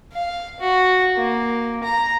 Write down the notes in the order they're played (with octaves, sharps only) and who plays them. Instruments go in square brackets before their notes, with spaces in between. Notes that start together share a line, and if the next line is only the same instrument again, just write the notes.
[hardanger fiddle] F5
F#4
A#3
A#5